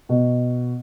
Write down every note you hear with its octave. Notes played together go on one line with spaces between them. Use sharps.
B2